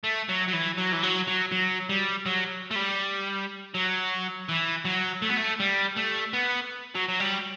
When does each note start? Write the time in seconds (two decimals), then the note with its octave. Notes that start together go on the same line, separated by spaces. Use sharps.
0.04 A3
0.29 F#3
0.48 F#3
0.53 E3
0.78 F#3
0.93 E3
1.03 F#3
1.28 F#3
1.52 F#3
1.89 G3
2.26 F#3
2.71 A3
2.75 G3
3.74 F#3
4.49 E3
4.85 F#3
5.22 A3
5.29 B3
5.37 A3
5.60 G3
5.96 A3
6.33 B3
6.95 F#3
7.09 F#3
7.20 G3